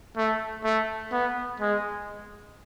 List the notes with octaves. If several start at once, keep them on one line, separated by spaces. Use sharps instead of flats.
A3
A3
B3
G#3